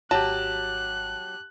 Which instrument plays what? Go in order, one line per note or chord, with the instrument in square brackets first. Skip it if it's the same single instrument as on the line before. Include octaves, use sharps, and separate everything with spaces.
[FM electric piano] G#1 [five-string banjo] F#3 [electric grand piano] G4 A5 [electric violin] F#6